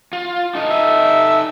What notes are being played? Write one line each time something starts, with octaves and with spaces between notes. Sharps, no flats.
F4
D#4 A4 D#5
E5